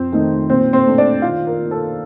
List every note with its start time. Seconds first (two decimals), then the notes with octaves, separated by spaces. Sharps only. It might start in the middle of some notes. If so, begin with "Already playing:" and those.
Already playing: F2 C4 C5
0.12 D#3 A3 C4 D#4
0.49 A#2 C4 C5
0.73 C4 C5
0.86 A3 D4
0.98 D4 D5
1.22 D#3 F4 F5
1.47 A#4
1.59 A#3 D#4
1.71 A4